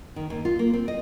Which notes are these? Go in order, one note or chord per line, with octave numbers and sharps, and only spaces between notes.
D#3
D#2
F4
A#3
C4
D#5